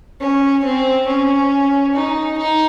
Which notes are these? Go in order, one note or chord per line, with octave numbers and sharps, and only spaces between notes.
C#4
C4
C#4
D#4
D#4